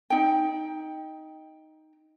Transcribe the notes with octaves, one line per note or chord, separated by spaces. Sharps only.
D#4 G5